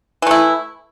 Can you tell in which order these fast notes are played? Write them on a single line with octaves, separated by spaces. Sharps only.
E3 A3 E4